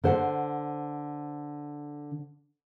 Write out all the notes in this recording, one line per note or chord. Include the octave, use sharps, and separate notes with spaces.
D3 C5 F#5